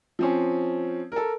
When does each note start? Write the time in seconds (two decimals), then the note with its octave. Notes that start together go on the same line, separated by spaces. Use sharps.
0.19 F3 C4 C#4
1.12 A4 A#4